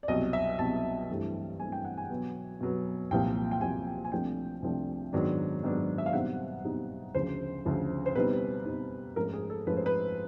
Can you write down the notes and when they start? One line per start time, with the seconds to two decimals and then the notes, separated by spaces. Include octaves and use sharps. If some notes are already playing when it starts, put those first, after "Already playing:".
0.03 D5
0.08 C2 B2 F#3 D#5
0.33 E5
0.58 C2 B2 F#3 A5
1.09 G2 E3 A3 C4
1.60 G2 E3 A3 C4 G#5
1.72 G5
1.85 F#5
1.97 G#5
2.10 B2 F#3 B3
2.60 B2 F#3 B3
3.11 C2 A#2 F3 A#3 G5
3.51 G5
3.61 C2 A#2 F3 A#3 G#5
3.87 G5
4.05 G#5
4.12 C2 C3 F3 A3 D4 G5
4.62 C2 C3 F3 A3 D4
5.13 G#2 D#3 F#3 B3 D4
5.63 G#2 D#3 F#3 B3 D4
5.98 E5
6.06 F5
6.13 B2 G3 C4 D#4 F#5
6.64 B2 G3 C4 D#4
7.15 D2 C#3 F3 C5
7.65 D2 C#3 F3
8.06 C5
8.15 B2 G3 C4 D#4 B4
8.65 B2 G3 C4 D#4
9.16 G#2 F3 A3 C#4 A#4
9.33 G#4
9.50 A4
9.67 G#2 F3 A3 C#4 B4
9.77 C5
9.86 B4